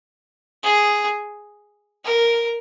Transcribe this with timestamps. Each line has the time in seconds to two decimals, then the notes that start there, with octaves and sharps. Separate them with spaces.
0.63 G#4
2.04 A#4